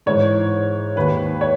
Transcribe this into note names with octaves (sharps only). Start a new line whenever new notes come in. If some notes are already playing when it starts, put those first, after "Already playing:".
G#2 E3 C#5
D#2 D#3 B4
C#5